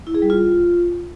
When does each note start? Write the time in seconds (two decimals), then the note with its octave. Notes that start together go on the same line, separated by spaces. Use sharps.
0.07 E4
0.14 G#4
0.22 G3
0.30 F4